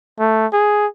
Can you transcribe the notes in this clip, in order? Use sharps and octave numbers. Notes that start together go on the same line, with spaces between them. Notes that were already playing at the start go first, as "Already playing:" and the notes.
A3
G#4